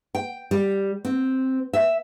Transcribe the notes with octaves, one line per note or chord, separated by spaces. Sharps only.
G5
G3
C4
E5